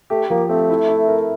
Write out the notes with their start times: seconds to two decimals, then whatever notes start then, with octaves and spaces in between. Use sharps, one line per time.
0.10 A3 G4
0.30 F3 A#3
0.49 A3 C4
0.70 E4
0.89 E4
1.08 A#4